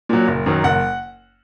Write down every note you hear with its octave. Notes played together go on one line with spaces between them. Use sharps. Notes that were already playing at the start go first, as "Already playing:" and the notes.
A#2 F#3
F#1
F#2 D#3 F#3
F#1 F#5